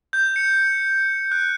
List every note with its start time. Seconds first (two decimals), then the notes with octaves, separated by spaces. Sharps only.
0.13 G6
0.36 C#7
1.32 F#6